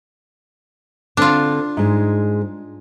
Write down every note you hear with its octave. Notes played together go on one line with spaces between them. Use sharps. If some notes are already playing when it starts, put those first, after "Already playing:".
D3 C4 D4 F4
G#2 G#3